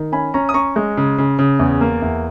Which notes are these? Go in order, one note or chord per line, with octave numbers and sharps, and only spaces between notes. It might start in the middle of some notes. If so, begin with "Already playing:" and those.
Already playing: D#3
C#4 G#5 B5
C#4 A#5 C#6
D#6
C#4 A#5 C#6
G#3
C#3
C#3
C#3
E2
A#3
E2